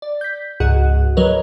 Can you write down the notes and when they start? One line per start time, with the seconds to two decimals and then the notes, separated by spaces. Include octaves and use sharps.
0.02 D5
0.21 G6 B6
0.60 C#2 G#2 F#4 G#4 F#5 F#6
1.17 F#3 A#4 B4 C#5 D#5